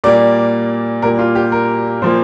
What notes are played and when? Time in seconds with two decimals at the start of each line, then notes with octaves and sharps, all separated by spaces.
0.04 A#2 G3 A#3 D5
1.02 A#2 G3 A#3 A#4
1.19 F4
1.35 G4
1.52 A#4
2.02 A#2 F3 A#3 C5